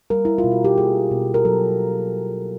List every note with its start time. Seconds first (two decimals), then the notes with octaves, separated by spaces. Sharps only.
0.10 G3 A#4
0.25 E4
0.38 F4
0.44 B2
0.52 F#4
0.64 G4
0.78 A#3 G#4
1.11 B2
1.34 A#4
1.45 F#3 A4